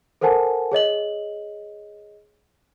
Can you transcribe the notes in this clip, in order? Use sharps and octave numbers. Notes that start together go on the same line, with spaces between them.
A4 A#4 C5 F#5 G#5 A5
G#4 C#5 D#5 F#7